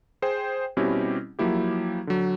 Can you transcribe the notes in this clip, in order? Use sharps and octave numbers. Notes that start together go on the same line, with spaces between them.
G#4 C5 G5
B2 G3 C4 C#4 E4 G4
F3 F#3 A#3 E4 G4
D3 F#3